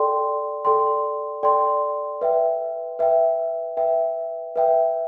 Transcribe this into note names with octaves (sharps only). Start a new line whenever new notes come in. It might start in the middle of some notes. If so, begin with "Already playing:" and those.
Already playing: A4 D5 G5 C6
A4 D5 G5 C6
A4 D5 G5 C6
B4 E5 G5
B4 E5 G5
B4 E5 G5
B4 E5 G5